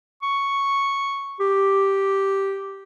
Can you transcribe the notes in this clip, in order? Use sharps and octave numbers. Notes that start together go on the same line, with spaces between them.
C#6
G4